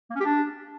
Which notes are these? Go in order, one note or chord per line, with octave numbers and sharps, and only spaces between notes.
A#3
C#4
G4
D4